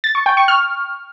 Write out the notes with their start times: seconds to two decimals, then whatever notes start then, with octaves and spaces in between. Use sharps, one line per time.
0.04 A6
0.15 C#6
0.26 G5
0.37 C#6
0.48 F6